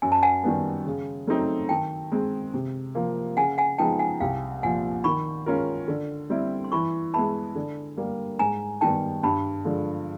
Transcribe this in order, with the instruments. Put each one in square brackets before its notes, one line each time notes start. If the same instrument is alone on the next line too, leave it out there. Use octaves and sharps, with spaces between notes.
[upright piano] F#2 [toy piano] G#5
[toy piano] A5
F#5 G#5
[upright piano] D#3 G3 B3
C#3
F#3 A3 C4 D#4
[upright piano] D#3 [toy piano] G5 A5
[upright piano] G#3 C4
C3
F3 A#3
[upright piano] C#3 [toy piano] F#5 G#5
[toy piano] F#5 G#5
[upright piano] F3 G#3 B3 D#4 [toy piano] G5 A5
[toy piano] F#5 G#5
[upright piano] C2 [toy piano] F5 G5
[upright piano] A#2 F3 [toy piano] F#5 G#5
[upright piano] D#3 [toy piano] B5 C#6
[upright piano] G#3 C#4 F4 A#4
D3
G3 C4 E4
[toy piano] C6
[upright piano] E3 [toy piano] B5 C#6
[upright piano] G#3 B3 E4 [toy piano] A5 B5
[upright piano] D3
G3 A#3
[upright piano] G#2 [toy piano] G#5 A#5
[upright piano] D#3 G3 B3 [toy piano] G5 A5
[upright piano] G2 [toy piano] A5 B5
[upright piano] D3 F3 G#3